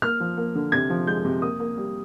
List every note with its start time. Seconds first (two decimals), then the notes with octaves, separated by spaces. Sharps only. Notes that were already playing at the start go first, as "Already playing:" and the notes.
0.02 A#3 F6
0.20 F3
0.37 A#3
0.55 D3
0.72 C3 G#6
0.90 F3
1.07 G#3 G6
1.25 C3
1.42 A#3 D#6
1.60 A#3
1.77 G3